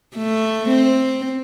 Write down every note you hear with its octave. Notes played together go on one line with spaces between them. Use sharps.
A3
C4